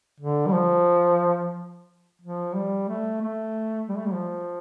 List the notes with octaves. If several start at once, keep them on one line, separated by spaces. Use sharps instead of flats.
D3
G3
F3
F3
G3
A3
A3
G3
A3
G3
F3